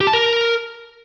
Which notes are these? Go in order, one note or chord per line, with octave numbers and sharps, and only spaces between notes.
G4
A5
A#4